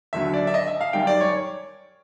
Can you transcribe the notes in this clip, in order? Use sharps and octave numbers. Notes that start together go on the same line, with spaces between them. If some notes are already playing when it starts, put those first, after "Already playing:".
D#2 D3 F#3 E5
D5
E5
D#5
E5
F5
F#2 D#3 G3 G5
D5
C#5